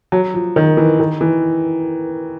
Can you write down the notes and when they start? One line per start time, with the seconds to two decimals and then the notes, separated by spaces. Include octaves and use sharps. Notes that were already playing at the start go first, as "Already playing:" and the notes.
0.12 F#3
0.34 F3
0.56 D#3
0.77 E3
1.00 D#3
1.21 E3